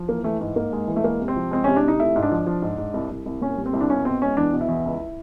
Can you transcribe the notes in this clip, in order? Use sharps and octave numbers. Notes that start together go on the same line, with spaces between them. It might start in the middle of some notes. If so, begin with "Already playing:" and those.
Already playing: F3
E3 A#3
E3 A3
G#2
G#2 A#3
G#3
E3
A3
G#3 A#3
C3
C4
F3
G#3 C4
C3 C#4
D4
C3 D#4
A3 E4
G#2
D4
F3
F3
G#2
G#2
C2
C2
C2
A#2 C#4
G3
C4
C2
D4
B2 C#4
B2 C4
G#3 C#4
E2 D4
B2
E4
E2
C#2